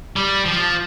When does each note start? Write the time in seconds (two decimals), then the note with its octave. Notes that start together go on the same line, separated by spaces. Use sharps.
0.16 G3
0.46 F3